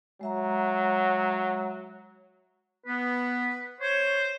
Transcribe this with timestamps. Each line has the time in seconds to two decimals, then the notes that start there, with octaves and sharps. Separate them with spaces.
0.21 F#3 G#3 E5 A#5
2.86 B3 B4
3.80 C5 C#5